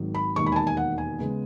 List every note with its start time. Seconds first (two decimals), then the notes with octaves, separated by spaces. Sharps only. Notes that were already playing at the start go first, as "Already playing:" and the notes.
Already playing: G#1 G#2 D#3 F#3
0.15 B5
0.36 E1 D#2 D#3 C#6
0.46 B5
0.52 G#5
0.56 A5
0.67 G#5
0.77 F#5
0.98 G#5
1.18 C#3 G#3 B3